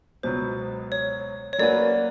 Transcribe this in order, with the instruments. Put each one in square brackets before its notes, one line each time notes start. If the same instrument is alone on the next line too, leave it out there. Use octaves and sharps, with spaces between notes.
[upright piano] C#2 B2 F#3 B3 [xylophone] C5
[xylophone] C#5
C#5
[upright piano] F#3 A#3 C#4 F#4 B4 [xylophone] D5